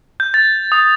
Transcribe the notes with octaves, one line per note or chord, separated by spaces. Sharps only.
G6
A6
D#6